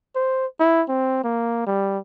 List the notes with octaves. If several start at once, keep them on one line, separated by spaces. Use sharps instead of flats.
C5
E4
C4
A#3
G3